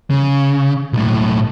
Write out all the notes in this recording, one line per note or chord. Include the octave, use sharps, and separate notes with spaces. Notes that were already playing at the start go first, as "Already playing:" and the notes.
C#3
B1 A2